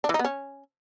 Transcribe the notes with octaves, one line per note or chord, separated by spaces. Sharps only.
D4
E3
D#4
B3
C#4